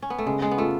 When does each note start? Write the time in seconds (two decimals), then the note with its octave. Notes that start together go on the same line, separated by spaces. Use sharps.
0.02 C#4
0.10 B3
0.19 A3
0.26 C#3 G#3
0.42 G#3
0.51 B3
0.58 A3 F4